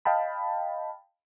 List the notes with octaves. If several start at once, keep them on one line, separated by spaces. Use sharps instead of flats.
D#5 F5 G5 A5 B5